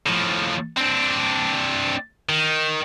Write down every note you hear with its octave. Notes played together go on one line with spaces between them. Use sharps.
A2 F3
C4 D4
D#3